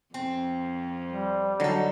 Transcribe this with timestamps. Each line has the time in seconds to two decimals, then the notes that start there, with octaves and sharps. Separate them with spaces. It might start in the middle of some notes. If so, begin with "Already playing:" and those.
0.14 F2 C4
1.07 G3
1.60 D3 F#3 D#4 A4